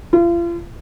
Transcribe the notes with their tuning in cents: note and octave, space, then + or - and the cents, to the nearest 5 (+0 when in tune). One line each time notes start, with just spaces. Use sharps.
F4 -40